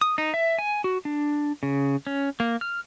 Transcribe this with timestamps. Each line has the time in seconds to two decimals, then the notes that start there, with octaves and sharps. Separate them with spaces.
0.01 D#6
0.18 D#4
0.34 E5
0.59 G#5
0.84 F#4
1.05 D4
1.63 C#3
2.07 C#4
2.40 A#3
2.61 F6